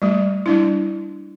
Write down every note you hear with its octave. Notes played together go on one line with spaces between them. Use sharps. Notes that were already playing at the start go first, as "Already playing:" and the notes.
G3 A3
G3 D4 E4